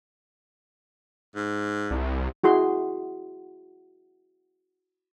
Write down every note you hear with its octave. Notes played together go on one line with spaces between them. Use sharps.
G#2
C2
E4 F#4 G#4 C6